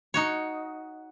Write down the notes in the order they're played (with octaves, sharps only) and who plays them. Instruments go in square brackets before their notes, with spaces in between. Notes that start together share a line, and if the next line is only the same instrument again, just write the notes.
[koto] D#4 F#4 C#5